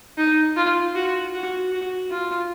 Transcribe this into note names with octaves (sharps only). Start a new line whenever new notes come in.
D#4
F4
F#4
F#4
F#4
F4